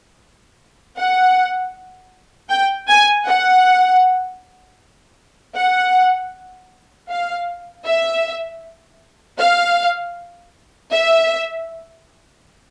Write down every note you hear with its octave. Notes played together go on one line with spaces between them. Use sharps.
F#5
G5
G#5
F#5
F#5
F5
E5
F5
E5